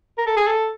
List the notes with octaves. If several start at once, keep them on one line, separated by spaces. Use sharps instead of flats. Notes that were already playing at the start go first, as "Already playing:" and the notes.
A#4
A4
G#4
A4